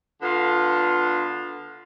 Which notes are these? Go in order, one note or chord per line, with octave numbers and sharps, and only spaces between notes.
D3 B3 F4